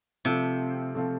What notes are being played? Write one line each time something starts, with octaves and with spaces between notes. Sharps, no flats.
C3 F3 A3 C4 F4
F3 A3 C4 F4